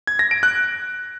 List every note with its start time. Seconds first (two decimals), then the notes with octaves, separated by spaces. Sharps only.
0.07 G#6
0.19 A#6
0.31 D7
0.43 F#6